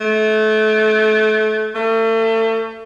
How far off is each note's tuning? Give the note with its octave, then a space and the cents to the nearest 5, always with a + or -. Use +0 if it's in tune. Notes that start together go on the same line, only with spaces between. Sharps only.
A3 -25
A3 +35